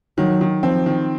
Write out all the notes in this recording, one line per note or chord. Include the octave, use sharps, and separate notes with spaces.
D#3 F#3
D#3
F3 C4
D#3